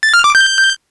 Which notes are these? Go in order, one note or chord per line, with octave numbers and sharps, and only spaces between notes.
A6
F6
D6
G6